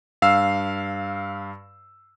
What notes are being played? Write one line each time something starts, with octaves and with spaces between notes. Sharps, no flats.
G2 F5 E6 C7